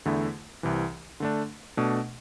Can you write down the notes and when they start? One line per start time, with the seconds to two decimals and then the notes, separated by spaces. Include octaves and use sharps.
0.06 E2 D3 A3 E4
0.63 C2 C3 E3
1.20 D3 A3 D4
1.77 B2 A3 D4